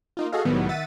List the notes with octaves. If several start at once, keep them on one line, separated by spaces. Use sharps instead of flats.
A#3 D#4 F4
F#4 G#4 A4 D#5 F5
C2 A2 D#3 F#3 G3 B3
D#3 E5 F#5 A6 B6 D#7